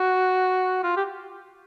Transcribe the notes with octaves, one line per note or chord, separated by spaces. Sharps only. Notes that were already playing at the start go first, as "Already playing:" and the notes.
Already playing: F#4
F4
G4